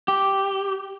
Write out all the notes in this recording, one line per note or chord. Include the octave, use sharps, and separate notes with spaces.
G4